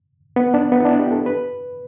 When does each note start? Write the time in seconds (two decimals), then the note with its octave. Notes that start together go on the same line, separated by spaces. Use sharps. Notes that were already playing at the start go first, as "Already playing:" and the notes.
0.36 B3
0.54 D4
0.72 B3
0.80 E4
0.85 D4
0.99 G4
1.12 A4
1.26 B4